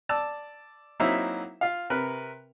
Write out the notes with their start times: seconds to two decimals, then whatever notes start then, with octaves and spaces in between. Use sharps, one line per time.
0.09 D5 A5 E6
1.00 F#3 A#3 C4 D#4 E4 E5
1.61 F4 F5
1.90 C3 A#4 B4